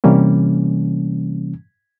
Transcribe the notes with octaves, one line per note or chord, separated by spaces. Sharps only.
C3 E3 G3 A#3 C#4